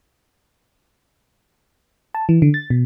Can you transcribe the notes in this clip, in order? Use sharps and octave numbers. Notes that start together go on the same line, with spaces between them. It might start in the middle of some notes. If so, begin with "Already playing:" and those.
A5
E3
D3
A6
B2